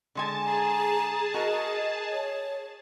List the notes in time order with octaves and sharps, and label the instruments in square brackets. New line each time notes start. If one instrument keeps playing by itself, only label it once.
[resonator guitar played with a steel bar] D3 G#3 G#5 [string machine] A5
[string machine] G#4 A5 [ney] A#5
[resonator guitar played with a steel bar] F#4 A#4 [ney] D#5
[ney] C#5